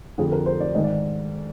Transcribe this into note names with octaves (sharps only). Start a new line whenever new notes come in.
F2 D3 G#4
A#4
C5
D5
G#2 D#3 D#5
D5